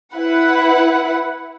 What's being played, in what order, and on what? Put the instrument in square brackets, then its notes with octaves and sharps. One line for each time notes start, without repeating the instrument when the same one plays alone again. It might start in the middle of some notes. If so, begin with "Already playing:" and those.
[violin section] E4 B4 F#5